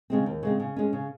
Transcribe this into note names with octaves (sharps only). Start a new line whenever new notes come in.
C#3 G#3 C4
D#2
C#3 G#3 C4
C#3
G#3 C#4
C#3